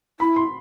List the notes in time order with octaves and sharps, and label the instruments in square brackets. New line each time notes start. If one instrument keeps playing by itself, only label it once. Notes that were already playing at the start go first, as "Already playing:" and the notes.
[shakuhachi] E4 [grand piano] B5
[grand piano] C6